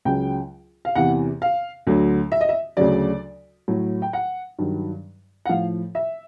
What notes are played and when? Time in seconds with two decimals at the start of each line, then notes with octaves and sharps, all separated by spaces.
0.05 C#2 C#3 F#3 G5
0.85 F5
0.95 E2 C3 E3 F#5
1.42 F5
1.87 D2 D3 F#3
2.32 E5
2.41 D#5
2.49 E5
2.77 D2 C#3 F#3 D5
3.68 A2 F#3
4.02 G5
4.13 F#5
4.59 G2 D#3 F#3
5.46 F#5
5.49 A2 F3 F5
5.95 E5